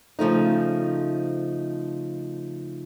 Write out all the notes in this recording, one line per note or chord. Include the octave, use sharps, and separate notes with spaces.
C#3 F3 A3 D#4